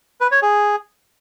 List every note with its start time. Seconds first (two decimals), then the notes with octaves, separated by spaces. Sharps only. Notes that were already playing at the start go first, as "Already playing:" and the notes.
0.21 B4
0.31 C#5
0.42 G#4